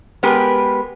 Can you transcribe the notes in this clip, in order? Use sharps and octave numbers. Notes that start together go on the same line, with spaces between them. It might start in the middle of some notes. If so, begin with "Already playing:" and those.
G#3 B3 G4 A#4 B4